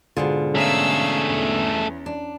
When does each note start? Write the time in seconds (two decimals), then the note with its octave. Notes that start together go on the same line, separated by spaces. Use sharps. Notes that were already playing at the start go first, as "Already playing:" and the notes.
0.17 G#2 B2 D3 F4 G#4
0.55 A3 C#4 G#4 F5 A#5 E6 B6
1.23 E2
2.06 D4